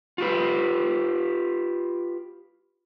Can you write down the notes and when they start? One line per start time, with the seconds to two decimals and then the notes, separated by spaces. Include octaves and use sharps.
0.18 F4 G4 B4